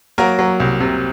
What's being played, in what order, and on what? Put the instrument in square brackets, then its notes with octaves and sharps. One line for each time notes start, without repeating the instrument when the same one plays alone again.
[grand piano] F#3 A#3 A#4
F#3
C2
C3